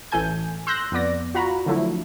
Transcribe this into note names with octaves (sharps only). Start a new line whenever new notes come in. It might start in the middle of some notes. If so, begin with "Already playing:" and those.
A1 A2 E3 A4 G#5 G6
C6 E6 F#6 G6 A#6
F2 B3 D5 A#6
F4 F#4 A#5 B5
D3 F3 F#3 A3 E4